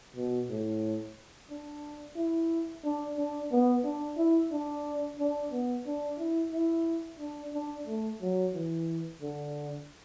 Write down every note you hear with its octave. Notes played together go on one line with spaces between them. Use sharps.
B2
A2
D4
E4
D4
D4
B3
D4
E4
D4
D4
B3
D4
E4
E4
D4
D4
A3
F#3
E3
D3